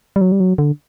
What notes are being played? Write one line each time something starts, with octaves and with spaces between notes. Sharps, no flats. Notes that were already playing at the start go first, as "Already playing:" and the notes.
G3
F#3
G3
F#3
D3